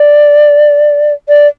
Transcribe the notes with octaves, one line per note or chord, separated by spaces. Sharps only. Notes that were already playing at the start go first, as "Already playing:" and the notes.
Already playing: D5
D5